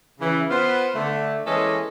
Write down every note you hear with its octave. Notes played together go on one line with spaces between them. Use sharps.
C#3 E3
B3 F4 C5
D3 A3
E3 G#3 A#3 C#4 A4 D#5